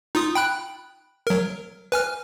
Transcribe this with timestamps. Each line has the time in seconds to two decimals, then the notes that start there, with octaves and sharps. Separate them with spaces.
0.15 D#4 F4 D#6
0.35 G5 B5 F#6
1.27 F#3 A#4
1.92 B4 G#5 F6